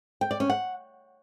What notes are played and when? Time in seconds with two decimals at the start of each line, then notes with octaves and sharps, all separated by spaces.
0.21 G5
0.31 D5
0.40 C#4
0.50 F#5